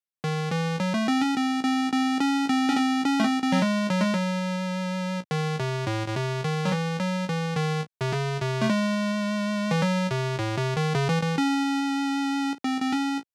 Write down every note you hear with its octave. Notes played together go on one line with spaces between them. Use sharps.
D#3
E3
F#3
A3
C4
C#4
C4
C4
C4
C#4
C4
C#4
C4
C#4
A3
C4
C4
F#3
G#3
F#3
G#3
F#3
D#3
C3
A2
A2
C3
D#3
F#3
E3
F#3
E3
D#3
C3
C#3
C3
A3
G#3
E3
F#3
C3
A2
C3
D#3
C#3
E3
E3
C#4
C4
C4
C#4